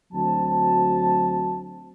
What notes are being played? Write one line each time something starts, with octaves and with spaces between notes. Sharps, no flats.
D2 F#3 C4 F#4 A5